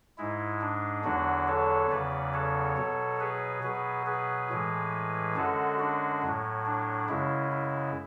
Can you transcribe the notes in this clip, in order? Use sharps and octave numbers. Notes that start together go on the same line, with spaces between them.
G#2 G#3 E4
D4
E2 D3 F#3 D4 F#4
A4 C#5
E2 C#3 F#3 B4 D5
A4 C#5
B2 F#3
G#4 B4
B2 F#3 G#4 B4
G#4 B4
A2 E3 G#3
F#2 D3 G#3 F#4 A4
D4 F#4
A2 F#3
D4
F#2 C#3 G#3 E4
E4